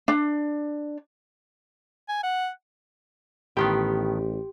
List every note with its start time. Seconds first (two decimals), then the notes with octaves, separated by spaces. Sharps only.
0.08 D4
2.09 G#5
2.23 F#5
3.57 A1 A2 D#3 B3 G4 C6